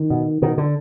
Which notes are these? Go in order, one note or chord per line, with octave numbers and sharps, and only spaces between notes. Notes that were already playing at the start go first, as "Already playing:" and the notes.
Already playing: D#3
B2
B2 D#3
D3